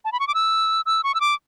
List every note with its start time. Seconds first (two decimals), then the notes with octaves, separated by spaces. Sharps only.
0.05 A5
0.12 B5
0.20 C#6
0.28 D6
0.34 E6
0.86 E6
1.04 C#6
1.14 E6
1.21 D6